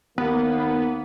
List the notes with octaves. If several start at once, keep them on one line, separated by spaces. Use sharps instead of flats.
D#2 A#3 B3